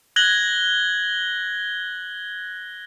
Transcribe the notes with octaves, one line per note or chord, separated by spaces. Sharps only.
F#6 G#6 A#6 F#7 G7